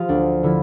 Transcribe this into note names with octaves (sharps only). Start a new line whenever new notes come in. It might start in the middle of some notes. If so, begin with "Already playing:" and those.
Already playing: F3 F4 G#4
D2 D4
D3 F3 E4